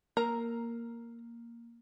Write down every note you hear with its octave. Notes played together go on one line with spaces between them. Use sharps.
A#3 A#4 A#5